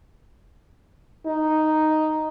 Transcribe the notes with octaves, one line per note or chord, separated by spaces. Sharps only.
D#4